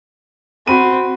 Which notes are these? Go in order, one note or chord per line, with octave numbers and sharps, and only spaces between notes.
C4 F#4 B5 D#7